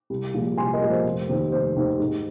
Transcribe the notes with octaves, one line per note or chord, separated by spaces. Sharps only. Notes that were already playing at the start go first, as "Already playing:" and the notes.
C2
A#2 F3 G#3
C2 G#5 C6
A#4 D#5
A#2 F3 G#3
C5
F1
D#2 D#3 C4
F1 C5
D#2 D#3 C4
G#2